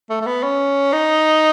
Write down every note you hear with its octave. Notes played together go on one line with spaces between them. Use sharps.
A3
A3
B3
C#4
D#4